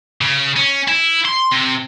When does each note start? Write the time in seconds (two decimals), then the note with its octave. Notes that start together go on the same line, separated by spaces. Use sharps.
0.21 C#3
0.56 C#4
0.88 E4
1.26 C6
1.52 C3